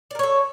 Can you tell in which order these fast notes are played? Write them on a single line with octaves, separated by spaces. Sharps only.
D5 A#4 C#5 A4